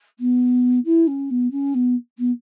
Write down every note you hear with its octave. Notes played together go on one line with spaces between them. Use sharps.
B3
E4
C#4
B3
C#4
B3
B3